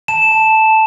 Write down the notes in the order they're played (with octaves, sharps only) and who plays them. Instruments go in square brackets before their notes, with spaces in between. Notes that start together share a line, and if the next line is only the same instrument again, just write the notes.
[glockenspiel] A5 E7
A5